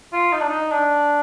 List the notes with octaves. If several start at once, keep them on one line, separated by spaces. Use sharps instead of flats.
F4
D#4
D4
D#4
D4